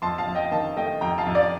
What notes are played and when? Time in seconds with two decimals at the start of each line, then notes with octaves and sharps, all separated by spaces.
0.02 F2 A5 C6
0.18 F5 A5
0.27 F2
0.35 D#5 G5
0.51 D#3 F5 A5
0.77 A3 D#5 G5
1.01 F2 G5 A#5
1.18 F5 A5
1.26 F2
1.35 D5 F5